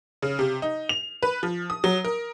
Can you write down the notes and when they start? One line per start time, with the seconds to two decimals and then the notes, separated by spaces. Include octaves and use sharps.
0.22 C#3
0.39 C3
0.62 D#4
0.89 F7
1.23 B4
1.43 F3
1.70 D#6
1.84 F#3
2.05 A#4